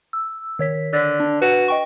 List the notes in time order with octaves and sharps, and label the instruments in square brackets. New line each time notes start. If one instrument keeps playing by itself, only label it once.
[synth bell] E6
D#3 C#5 B6
[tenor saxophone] D3 [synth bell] A6 B6
[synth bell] D4
[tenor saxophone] F#4 [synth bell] B4
[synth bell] D#5 G5 C#6